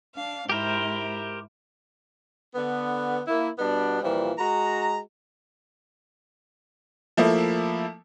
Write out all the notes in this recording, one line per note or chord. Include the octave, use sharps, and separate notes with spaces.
D4 F5
G#2 E4 G4 A#4 C5
D3 B3
A#3 E4
B2 G3 B3 D4
A#2 E3 F3 G3
G#3 F#4 A#5
F3 A3 A#3 E4